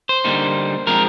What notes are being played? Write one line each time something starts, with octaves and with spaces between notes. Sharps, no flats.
C5
D3 G3 A#3 D#4
F3 G#3 C4 D#4 A#4